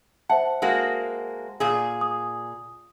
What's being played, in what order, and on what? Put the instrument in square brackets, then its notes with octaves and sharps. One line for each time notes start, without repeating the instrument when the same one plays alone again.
[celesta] C5 E5 A5 [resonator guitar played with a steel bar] F#5
[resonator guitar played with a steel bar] G#3 A#3 F#4
A#2 G#4
[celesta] D#6